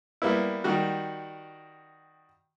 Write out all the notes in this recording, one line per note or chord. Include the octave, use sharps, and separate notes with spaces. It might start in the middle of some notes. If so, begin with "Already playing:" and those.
G3 A#3 B3 E4
D#3 G3 F#4